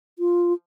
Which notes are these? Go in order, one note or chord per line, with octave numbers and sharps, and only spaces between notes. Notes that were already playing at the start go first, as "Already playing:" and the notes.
F4